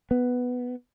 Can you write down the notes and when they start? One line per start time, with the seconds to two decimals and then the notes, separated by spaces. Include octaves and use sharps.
0.11 B3